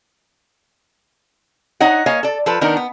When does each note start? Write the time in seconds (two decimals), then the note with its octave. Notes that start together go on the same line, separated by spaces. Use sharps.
1.80 D#4 C#5 D#5 F#5
2.06 A#3 C#5 D#5 F5 G#5
2.23 A4 D5
2.46 F3 A4 B4
2.61 D#3 B3 D4 D#4 A#4
2.77 B3